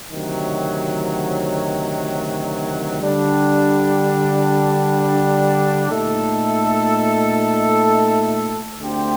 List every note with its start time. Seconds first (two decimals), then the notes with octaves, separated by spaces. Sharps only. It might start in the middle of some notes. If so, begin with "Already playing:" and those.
0.11 D2 C3 D#3 F#3
3.01 D3 G3 D4
5.91 A#2 A3 D#4 A4
8.79 D2 D3 A3 C4 G4